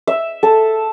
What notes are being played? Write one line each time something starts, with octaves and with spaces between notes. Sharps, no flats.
E5
A4